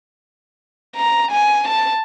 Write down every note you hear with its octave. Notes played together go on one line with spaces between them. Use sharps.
A#5
G#5
A5